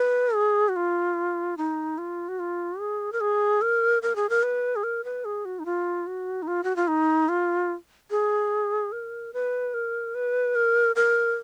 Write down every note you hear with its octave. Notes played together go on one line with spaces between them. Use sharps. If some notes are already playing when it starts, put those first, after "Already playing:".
Already playing: B4
G#4
F#4
F4
D#4
F4
F#4
F4
G#4
A#4
G#4
A#4
A#4
G#4
A#4
B4
G#4
A#4
B4
G#4
F#4
D#4
F4
F#4
D#4
F4
F#4
F4
D#4
F4
G#4
A#4
B4
A#4
B4
A#4
A#4